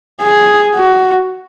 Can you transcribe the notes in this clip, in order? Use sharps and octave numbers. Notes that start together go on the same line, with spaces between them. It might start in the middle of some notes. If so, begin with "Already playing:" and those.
G#4
F#4